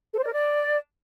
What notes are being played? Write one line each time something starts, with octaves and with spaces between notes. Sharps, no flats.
A4
C5
D5
A#4
D5